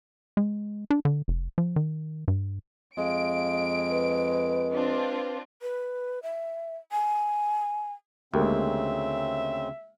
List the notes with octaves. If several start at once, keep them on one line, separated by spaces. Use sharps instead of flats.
G#3
D4
D3
F1
F3
D#3
G2
F2 G#3 F5 D7
B4
C4 D4 F4
B4
E5
G#5
D2 C#3 G#3 A#3 C4 G4 E5